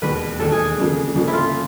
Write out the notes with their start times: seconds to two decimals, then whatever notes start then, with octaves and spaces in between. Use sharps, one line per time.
0.02 E1 D#2 D#3 B4
0.39 E1 D#2 D#3 A4
0.52 G#4
0.78 G1 F2 C#3 F3 A#3
1.15 G1 F2 C#3 F3 A#3
1.27 E4
1.33 F4